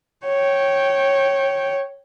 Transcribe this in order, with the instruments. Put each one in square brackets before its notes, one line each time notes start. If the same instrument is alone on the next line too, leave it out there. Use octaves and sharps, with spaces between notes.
[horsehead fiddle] C#5 G5